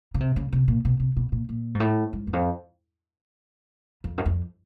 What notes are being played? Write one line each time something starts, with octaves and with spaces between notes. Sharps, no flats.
C#3
C3
C#3
C3
A#2
B2
C3
B2
A#2
A#2
G#2
A2
G#2
E2
F2
F2
F#2
F2